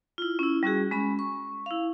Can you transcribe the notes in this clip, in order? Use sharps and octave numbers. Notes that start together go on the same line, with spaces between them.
E4 F4
C#4 E4
G3 C#4 F#4 G#4
G#3 C#4 B5
C#6
E4 F5